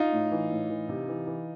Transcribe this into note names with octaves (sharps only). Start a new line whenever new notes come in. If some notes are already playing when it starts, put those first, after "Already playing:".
Already playing: D#4 F4
A2
E3
A2
E3
C3
E3
E3